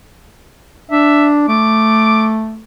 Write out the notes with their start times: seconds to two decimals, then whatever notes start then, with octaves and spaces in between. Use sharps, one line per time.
0.91 D4 E5
1.48 A3 D6